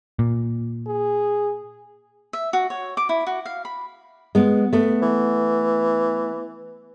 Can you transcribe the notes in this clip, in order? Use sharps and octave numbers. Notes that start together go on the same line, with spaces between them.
A#2
G#4
E5
F#4
C#5
D6
E4
F#4
F5
B5
G#3 B3
A3 B3
E3